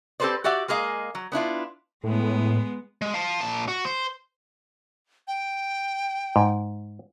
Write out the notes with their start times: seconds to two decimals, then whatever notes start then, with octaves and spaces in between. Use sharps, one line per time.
0.20 C4 G4 A4 B4 C5 D5
0.44 F#4 G4 D5 E5 F#5
0.68 G#3 A#3 G#4 D#5 F5
1.15 F#3
1.32 B3 D4 E4 F4
2.04 A2 G#3 B3
3.02 G#3
3.14 F5 A5
3.41 A#2 A5
3.68 F#4
3.85 C5
5.28 G5
6.36 G#2